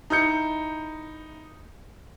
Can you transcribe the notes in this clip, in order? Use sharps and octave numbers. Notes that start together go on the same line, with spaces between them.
D#4 E4 G6 C#7